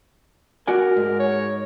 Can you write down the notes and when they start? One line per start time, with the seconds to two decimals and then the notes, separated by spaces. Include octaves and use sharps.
0.67 F#4 A#4 D5 G#5
0.97 G#2
1.19 C#5